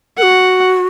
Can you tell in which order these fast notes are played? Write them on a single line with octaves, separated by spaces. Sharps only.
A#4 F#5 F#4